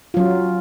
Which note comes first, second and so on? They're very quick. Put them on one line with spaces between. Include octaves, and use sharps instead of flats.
F4 F#3 C#4